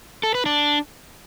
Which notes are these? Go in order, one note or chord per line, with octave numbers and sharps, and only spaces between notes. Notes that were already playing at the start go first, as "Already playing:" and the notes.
A4
B4
D4